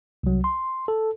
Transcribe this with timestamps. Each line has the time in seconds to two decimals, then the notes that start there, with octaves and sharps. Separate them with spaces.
0.23 C2 F#3
0.44 C6
0.88 A4